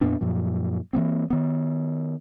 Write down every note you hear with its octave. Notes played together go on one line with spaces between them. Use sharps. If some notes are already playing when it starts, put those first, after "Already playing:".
F2 A#2 B3 D4
F#2 A#2 F3
E3 F3 A#3 C4
D#3 B3